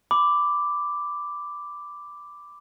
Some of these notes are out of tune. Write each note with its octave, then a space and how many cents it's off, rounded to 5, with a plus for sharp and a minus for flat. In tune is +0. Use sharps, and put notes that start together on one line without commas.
B5 +20 D6 +0